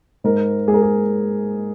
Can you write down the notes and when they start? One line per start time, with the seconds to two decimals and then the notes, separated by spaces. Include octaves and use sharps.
0.24 G#2 A#4
0.67 G#3 G#4
0.74 A#4
0.82 G#4